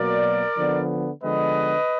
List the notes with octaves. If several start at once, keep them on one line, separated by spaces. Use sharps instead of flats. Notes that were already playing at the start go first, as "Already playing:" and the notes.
Already playing: B2 F#3 A#3 A#4 D5
D3 F3 B3
D3 F3 G#3 B3 B4 D#5